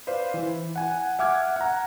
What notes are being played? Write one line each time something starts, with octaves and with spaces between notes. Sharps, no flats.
B4 C5 D5 F5
E3
F#5 G#5
E5 F#5 D6 F6 G#6
F#5 A#5